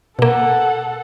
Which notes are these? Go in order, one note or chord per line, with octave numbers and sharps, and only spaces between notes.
B2 A#3 A4 F#5